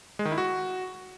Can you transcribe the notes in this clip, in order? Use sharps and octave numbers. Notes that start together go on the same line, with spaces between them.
G#3
D#3
E4
F#4